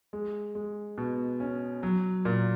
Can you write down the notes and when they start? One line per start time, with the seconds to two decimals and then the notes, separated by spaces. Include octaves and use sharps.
0.13 G#3
0.55 G#3
0.98 B2
1.40 C#4
1.83 F#3
2.25 A#2